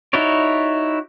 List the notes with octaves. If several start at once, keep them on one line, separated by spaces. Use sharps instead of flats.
D#4 E4 F#4 C#5 D5